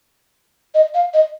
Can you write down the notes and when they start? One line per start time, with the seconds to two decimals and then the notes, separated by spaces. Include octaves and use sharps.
0.75 D#5
0.94 F5
1.14 D#5